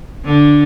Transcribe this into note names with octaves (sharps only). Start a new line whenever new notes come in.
D3